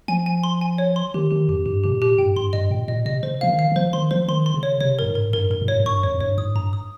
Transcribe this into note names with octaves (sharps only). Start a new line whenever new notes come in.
F3 G#5
G#5
C6
G#5
C#5
C6
D#3 G4
D#3 G4
F2 G4
G2 G4
C3 G4
A#2
G4
G2 G5
G2 C6
G2 D#5
A#2 G5
A#2 D#5
C3 D#5
C#3 C5
F3 F5
D#3
F5
D#3
F3 C5
D#3 C6
F3 C5
D#3 C6
C6
C#3
C#5
C3 C#5
G2 A#4
G#2
A#4
G2 A#4
G2 A#4
A#2
G#2 C#5
G#2
G2 C#6
F2 C#5
F2
G2 C#5
G#2 D#6
G2 A#5
D#6